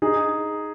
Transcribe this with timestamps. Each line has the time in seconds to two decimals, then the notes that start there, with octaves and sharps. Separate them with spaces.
0.02 D#4 G#4